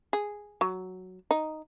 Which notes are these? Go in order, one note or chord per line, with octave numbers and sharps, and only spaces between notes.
G#4
F#3
D#4